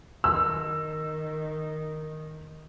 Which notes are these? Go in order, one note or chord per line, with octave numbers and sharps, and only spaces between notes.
D#3 E6